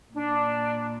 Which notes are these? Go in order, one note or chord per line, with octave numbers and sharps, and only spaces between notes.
A#2 D4